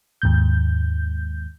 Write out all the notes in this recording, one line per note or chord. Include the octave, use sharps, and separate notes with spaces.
D#2 G#2 G6